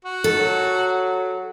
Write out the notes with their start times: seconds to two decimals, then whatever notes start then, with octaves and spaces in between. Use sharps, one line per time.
0.05 F#4
0.24 D#3 A4
0.39 F#3